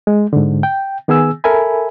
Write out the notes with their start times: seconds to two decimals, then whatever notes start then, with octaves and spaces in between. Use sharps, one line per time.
0.07 G#3
0.33 G#2 D3
0.63 G5
1.08 D#3 B3 G#4 G#5 E6
1.44 A4 A#4 E5 G#5 B5